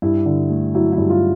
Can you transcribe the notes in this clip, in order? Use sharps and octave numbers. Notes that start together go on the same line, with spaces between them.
G2 E4
D3
A3
F#3 E4
E4
G2
F4